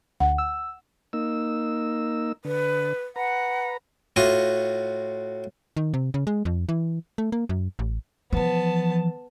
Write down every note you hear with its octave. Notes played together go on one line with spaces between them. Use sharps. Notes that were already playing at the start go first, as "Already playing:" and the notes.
D2 F#5
E6
A#3 D#4 E6
D3 B4
B4 F#5 A#5
A2 F4 F#4 D#6
D#3
C3
C#3
G#3
F2
E3
A3
A#3
F#2
A1
E3 F3 B3 A5